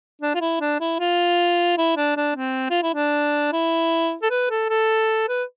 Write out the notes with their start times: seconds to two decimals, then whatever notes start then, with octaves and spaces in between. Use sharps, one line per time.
0.22 D4
0.35 F4
0.41 E4
0.60 D4
0.80 E4
0.99 F4
1.77 E4
1.97 D4
2.17 D4
2.35 C4
2.70 F4
2.82 E4
2.94 D4
3.53 E4
4.22 A4
4.31 B4
4.50 A4
4.69 A4
5.28 B4